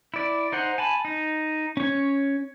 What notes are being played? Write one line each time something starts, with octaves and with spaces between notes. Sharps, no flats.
E4 D5
D#4 C5 F#5
G#5 A5 B5
D#4
C#4 C#5